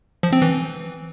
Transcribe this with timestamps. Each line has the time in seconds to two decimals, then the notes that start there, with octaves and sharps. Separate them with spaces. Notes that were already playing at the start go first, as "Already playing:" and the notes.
0.23 F3
0.33 C4
0.42 E3